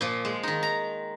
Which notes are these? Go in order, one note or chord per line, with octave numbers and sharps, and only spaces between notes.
A#2 F3
G#3
D#3 D#4
A#5